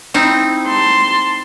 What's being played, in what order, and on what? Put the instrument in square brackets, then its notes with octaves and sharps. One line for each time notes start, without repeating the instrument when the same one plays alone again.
[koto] C4 D#4 E4
[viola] A5 C6